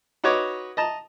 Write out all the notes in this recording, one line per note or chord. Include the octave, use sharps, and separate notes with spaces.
D#4 F#4 B4 C#5 D6
D#5 A5 A#5